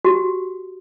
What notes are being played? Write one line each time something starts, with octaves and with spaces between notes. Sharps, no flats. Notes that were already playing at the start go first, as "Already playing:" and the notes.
F#4 G4